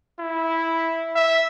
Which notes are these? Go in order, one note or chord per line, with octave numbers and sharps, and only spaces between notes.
E4
E5